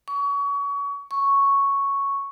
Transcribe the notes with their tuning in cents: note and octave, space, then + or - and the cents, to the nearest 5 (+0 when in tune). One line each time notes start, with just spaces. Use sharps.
C#6 +30
C#6 +0